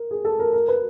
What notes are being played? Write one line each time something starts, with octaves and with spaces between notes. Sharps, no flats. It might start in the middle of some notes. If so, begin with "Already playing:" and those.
Already playing: A#4
G#4
A4
A#4
A#4
B4